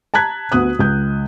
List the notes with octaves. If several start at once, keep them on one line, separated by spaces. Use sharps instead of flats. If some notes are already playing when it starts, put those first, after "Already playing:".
A5 A#5 F#6 G#6 B6
D2 B3 D#6 F#6
C#2 G6